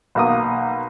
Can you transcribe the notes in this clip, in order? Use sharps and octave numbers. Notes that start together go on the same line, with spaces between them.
B1 A#3 D#6